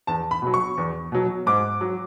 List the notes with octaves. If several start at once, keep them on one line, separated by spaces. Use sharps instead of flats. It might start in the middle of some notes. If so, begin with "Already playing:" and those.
E2 A5
B5
B2 F#3
C#6
E2
B2 F#3
G#2 D6
F#3